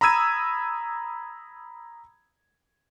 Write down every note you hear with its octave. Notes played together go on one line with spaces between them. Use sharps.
A#5 B5 D#6 E6 G#6 D#7